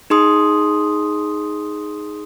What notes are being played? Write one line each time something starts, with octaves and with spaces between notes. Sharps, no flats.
D#4 G#4 C6 D#6